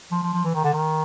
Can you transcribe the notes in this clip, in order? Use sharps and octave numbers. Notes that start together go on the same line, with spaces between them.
F3
F3
F3
E3
D#3
D3
D#3